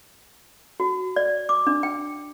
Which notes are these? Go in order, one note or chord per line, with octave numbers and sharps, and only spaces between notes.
F#4
D5
D6
D4
G5